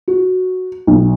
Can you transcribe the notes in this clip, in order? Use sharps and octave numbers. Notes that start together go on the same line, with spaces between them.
F#4
B1